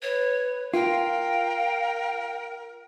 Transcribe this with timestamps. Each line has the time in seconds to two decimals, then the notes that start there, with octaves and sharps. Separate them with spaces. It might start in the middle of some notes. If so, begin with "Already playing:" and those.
0.02 B4 C#5
0.74 F4 A#4 F5 G5